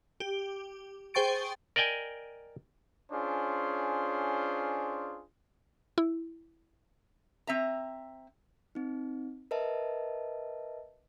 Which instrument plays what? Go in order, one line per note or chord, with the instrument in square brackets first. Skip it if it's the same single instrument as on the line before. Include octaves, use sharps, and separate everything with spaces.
[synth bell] G4
G#4 C5 G5 C#6 A6 D7
[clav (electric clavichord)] A#4 D5 D#5 G5 G#5
[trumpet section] C#4 D4 F4 G#4 C5
[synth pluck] E4
[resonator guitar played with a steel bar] C4 E5 A#5
[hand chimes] C4 D#4
A#4 B4 D#5 E5 A5